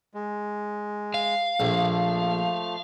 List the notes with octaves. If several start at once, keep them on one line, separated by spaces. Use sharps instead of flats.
G#3
F5
A#1 F3 A3